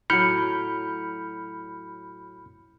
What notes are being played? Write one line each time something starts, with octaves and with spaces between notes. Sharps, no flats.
A2 F#3 B5 F6 G6 C#7